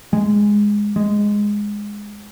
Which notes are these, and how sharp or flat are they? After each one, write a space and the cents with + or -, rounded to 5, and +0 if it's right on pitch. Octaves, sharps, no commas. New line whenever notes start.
G#3 -5
G#3 -5